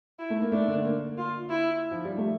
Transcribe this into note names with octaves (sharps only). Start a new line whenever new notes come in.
E4
A3
A#3
A3 D4
D3
A#3
F4
E4
F3
G3
A3